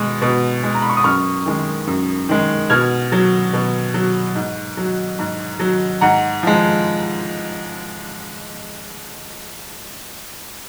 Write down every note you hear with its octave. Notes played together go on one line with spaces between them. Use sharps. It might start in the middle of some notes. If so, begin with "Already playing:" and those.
Already playing: B2 G#3
B2
G#3
A#5
B5
C#6
D#6
F#2 C#6 F6
D#3 G#3
F#2
D#3 G#3
B2 F6 G#6
F#3
B2
F#3
G#2
F#3
G#2
F#3
G#2 F#5 A#5
F3 G#3